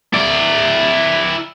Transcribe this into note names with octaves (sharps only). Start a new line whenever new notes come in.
E4 D5